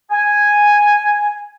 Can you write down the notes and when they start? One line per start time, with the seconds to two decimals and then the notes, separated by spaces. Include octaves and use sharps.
0.12 G#5